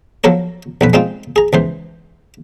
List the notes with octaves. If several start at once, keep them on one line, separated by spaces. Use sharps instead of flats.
F3 F#3 A4 A#4 C#5
B1 F2 B4
G#3 C4 D#4 F4
G#4 A#5
C#2 E3 C5